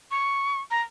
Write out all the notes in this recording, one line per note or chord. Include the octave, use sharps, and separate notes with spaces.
C#6
A#5